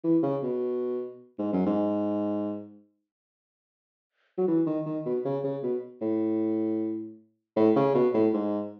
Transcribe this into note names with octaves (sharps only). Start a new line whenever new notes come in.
E3
C#3
B2
G#2
F#2
G#2
F#3
E3
D#3
D#3
B2
C#3
C#3
B2
A2
A2
C#3
B2
A2
G#2